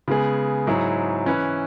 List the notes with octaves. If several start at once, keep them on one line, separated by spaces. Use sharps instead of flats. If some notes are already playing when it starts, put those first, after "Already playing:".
C#3 G#3 B3 G#4
G#2 F#3 E4 G#4 C#5
E3 C#4 E4 B4